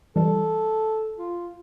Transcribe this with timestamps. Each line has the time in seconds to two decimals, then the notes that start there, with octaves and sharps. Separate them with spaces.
0.16 E3 G3 A4
1.18 F4